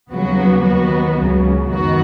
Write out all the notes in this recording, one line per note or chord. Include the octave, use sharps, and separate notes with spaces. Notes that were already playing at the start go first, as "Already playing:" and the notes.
D#2 C#3 F#3 B3 F#4
D#2 D#3 B3 F#4
C#2 C#3 F#3
F#2 D#3 B3 F#4